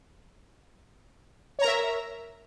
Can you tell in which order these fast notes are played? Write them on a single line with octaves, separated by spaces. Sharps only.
C#5 A#5 A#4 E5